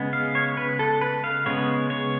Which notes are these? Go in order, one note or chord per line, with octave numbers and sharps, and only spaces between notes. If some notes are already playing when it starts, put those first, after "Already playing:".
Already playing: C#3 G#3 B3
F5
C#5
B4
A4
B4
F5
C#3 G#3 B3 C#5
C#5